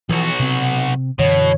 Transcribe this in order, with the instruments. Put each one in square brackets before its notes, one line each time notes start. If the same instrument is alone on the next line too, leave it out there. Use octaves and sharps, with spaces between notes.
[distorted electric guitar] B1 F#4 [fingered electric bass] E3 F3
[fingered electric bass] C3 C4
[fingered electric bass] F#2 D3 E3 [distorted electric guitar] B2 [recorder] C#5